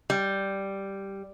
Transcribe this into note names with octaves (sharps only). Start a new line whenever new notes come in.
G3